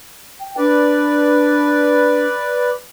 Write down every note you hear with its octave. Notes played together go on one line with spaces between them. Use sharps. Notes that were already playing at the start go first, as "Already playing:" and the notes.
G5
D4 B4 D5